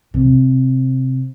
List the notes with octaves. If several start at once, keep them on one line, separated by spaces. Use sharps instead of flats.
C3